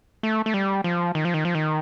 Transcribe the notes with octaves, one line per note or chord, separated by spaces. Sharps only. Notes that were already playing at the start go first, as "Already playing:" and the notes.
A3
A3
G3
F3
D#3
F3
D#3
F3
D#3